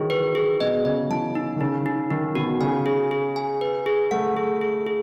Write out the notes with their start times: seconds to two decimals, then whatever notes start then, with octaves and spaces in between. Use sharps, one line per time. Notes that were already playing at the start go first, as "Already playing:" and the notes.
Already playing: D#3 E3 F#3 G#4
0.10 B4
0.35 G#4
0.60 B2 D#5
0.85 C#3 D#5
1.10 E3 A5
1.35 D#4
1.56 D#3
1.61 C#3 D#4
1.86 D#4
2.10 D#3 D#4
2.35 B2 F#4
2.61 C#3 G#5
2.86 G#4
3.11 G#4
3.36 G#5
3.61 B4
3.86 G#4
4.11 A3 F#5
4.37 G#4
4.61 G#4
4.86 G#4